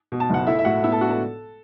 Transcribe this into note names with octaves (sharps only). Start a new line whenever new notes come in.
B2
A5
F#1 F#5
A3 E4 E5
E5
A2 F#4 F#5
B3 E4 E5
A4 A5
D4 F#4 F#5
A4 A5